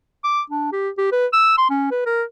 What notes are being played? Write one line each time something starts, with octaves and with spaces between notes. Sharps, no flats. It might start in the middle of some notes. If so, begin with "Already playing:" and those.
D6
D4
G4
G4
B4
E6
C6
C#4
B4
A#4